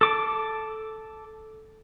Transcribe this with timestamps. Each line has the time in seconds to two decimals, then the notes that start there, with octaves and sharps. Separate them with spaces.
0.01 A4 D6